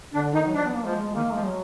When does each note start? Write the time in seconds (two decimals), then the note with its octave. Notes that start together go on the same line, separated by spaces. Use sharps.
0.14 D3 D4
0.33 D#3 D#4
0.47 F#3
0.54 F3 D4
0.65 B3
0.75 A#3
0.85 F3 G#3
1.00 G#3
1.15 D#3 A#3
1.33 F3 G#3
1.45 F#3